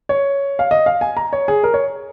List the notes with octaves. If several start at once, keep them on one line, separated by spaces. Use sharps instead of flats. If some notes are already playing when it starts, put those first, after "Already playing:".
C#5
F5
D#5
F5
G#5
A#5
C#5
G#4
A#4
C#5